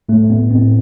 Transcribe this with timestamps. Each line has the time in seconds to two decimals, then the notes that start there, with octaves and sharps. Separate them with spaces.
0.09 A2 A3
0.29 A2 B3
0.51 A2 C4